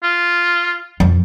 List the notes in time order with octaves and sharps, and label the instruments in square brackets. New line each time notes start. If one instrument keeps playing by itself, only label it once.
[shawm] F4
[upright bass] F2